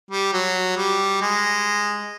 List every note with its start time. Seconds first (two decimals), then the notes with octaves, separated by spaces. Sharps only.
0.10 G3
0.33 F#3
0.77 G3
1.21 G#3